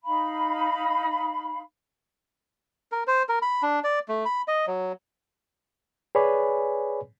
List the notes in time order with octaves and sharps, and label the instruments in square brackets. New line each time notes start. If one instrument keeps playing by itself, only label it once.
[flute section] D#4 F5 B5
[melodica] A#4
C5
A#4
B5
D4
D5
A3
B5
D#5
F#3
[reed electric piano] G#4 B4 C#5 D5 G#5 B5